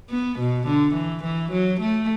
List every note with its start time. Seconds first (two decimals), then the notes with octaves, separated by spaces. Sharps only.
0.11 B3
0.39 B2
0.67 D3
0.95 E3
1.24 E3
1.52 F#3
1.81 A3